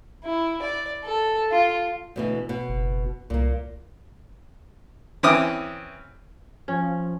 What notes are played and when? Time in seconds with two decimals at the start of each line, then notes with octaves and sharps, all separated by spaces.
0.24 E4
0.62 D5
1.04 A4
1.52 F4
2.16 D2 B2 E3
2.49 B2
2.69 F#1
3.30 C2 A#2 A#3
5.23 E3 C4 C#4 E4 D6 D#6
6.68 F3 C#4